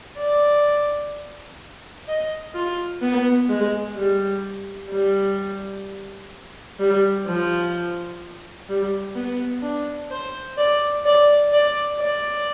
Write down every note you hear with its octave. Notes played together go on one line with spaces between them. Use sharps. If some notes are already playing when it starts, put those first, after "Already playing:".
D5
D#5
F4
B3
G#3
G3
G3
G3
F3
G3
B3
D4
C5
D5
D5
D5
D5